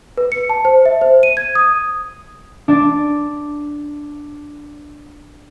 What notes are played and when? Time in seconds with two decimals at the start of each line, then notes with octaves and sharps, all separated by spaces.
0.18 B4
0.32 C#7
0.49 A5
0.65 C5
0.85 E5
1.01 C5
1.23 D#7
1.37 G#6
1.55 D#6
2.68 D4 D5